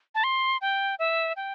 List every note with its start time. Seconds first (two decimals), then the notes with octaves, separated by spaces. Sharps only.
0.15 A5
0.24 C6
0.61 G5
0.99 E5
1.36 G5